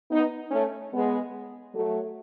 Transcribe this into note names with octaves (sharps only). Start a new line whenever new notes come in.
B3 D#4
A3 C#4
G#3 B3
F#3 A3